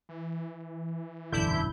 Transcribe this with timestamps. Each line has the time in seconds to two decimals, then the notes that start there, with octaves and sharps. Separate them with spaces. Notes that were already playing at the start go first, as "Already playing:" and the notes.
0.09 E3
1.32 E1 A#1 F#2 D3 E4 G6